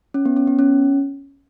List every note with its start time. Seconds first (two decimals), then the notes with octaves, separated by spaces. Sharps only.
0.14 C#4
0.25 B3
0.36 C#4
0.48 B3
0.59 C#4